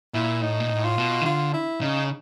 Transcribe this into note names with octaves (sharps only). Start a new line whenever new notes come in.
A#2 E4
A2 D#4
A#2
A2
F4
B2
D#3
D3 F4
E4
C#3 D#4